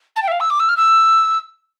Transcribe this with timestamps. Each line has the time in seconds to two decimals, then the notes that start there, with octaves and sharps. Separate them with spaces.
0.16 A5
0.22 G5
0.27 E5
0.31 F5
0.40 E6
0.50 D6
0.59 E6
0.68 F6
0.76 E6